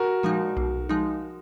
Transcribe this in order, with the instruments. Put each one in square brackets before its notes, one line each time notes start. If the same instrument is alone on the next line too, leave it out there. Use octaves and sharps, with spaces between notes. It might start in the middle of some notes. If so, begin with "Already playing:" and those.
Already playing: [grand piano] F#4 A#4
[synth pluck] A#2 F3 G#3 D#4
B1
F3 G#3 D#4